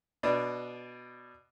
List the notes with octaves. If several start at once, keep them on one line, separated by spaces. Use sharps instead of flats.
B2 D4